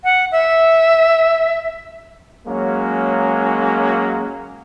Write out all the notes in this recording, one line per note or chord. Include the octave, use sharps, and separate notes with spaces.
F#5
E5
F#3 G#3 A#3 C#4